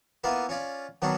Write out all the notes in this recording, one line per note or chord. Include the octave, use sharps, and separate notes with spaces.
A#3 B3 E4 F4 B4
C#4 F4 D5
D#3 F#3 B3 D4 F#4